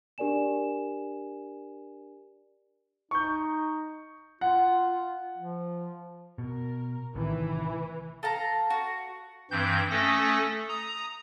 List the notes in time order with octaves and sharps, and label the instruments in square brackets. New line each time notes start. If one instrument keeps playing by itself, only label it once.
[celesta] D4 G4 A#4 D5 G#5 E7
[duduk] D#4 [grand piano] C#6 G6
[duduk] F4 [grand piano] F#5
[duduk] F3
[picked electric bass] B2 [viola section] A#4
[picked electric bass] A1 C3 D#3 [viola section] E3
[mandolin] A4 F5 A#5
F#4
[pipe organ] G2 E3 C4 G6
A3 C#4 A4 D#6 A#6
A#5 D#6